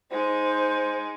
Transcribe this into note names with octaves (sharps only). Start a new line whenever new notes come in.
G#3 D#4 C5